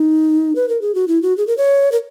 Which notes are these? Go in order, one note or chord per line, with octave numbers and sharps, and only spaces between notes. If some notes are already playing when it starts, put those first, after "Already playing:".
Already playing: D#4
B4
A#4
G#4
F#4
E4
F#4
G#4
A#4
C#5
A#4